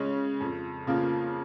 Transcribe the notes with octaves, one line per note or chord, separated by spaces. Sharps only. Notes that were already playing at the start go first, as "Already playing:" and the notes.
Already playing: C#3 G#3 C#4
F2
C#3 F3 A#3